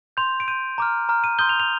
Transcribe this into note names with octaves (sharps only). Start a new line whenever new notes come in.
C6 G6 F7
D7
C6 G6 D#7
A#5 D6 F6
A#5 D6 F6
D#7
C6 D#6 G6 G7
F7
F7